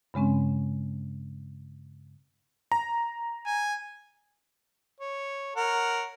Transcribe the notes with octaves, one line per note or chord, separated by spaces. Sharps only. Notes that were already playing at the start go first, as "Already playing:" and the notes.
G2 C#3 G#3 C4 C#4
A#5
G#5
C#5
A#4 C#5 F#5